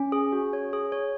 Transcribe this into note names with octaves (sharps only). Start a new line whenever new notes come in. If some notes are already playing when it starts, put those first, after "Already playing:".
Already playing: C#4
G#4
F#4
C#5
G#4
C#5